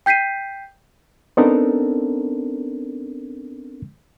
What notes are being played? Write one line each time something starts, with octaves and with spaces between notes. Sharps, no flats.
G5 G6 B6 C7 D#7
B3 C4 D4 D#4 A4 A#4